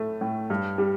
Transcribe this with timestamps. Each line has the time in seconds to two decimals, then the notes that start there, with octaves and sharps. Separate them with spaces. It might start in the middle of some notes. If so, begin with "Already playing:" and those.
Already playing: A2 A3
0.21 A2
0.50 G2
0.78 G3